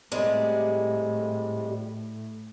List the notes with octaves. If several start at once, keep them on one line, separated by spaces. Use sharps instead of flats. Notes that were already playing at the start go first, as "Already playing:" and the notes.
A2 C3 G3 G#3